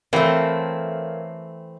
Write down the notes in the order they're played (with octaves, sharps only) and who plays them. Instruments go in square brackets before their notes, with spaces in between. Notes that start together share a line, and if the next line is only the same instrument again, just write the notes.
[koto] E3 [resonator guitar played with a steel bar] A3 C4 [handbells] A#4 C#5 F5